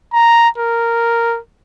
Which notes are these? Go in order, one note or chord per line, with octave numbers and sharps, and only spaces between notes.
A#5
A#4